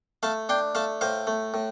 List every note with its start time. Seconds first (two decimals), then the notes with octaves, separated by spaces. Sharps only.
0.23 A3 F5 A5
0.49 D4 G5 C6
0.75 A3 F5 A5
1.01 A2 C5 F5
1.27 A3
1.54 A2